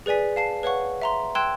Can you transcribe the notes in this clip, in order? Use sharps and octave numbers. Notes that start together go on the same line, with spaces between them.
G#4 B4 D5 G#5 B6
F5 A5 C7
B4 C#5 F5 F#5 C#6
E5 A#5 C6
G5 C6 E6 F#6 G#6 E7